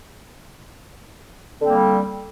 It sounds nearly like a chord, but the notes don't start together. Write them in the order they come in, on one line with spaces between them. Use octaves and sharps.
D3 C4 A#3 G3